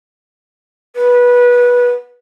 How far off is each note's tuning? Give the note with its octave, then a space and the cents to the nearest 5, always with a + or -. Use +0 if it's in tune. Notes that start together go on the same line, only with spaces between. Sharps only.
B4 -20